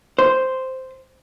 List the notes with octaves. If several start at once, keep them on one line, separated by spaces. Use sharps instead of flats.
C5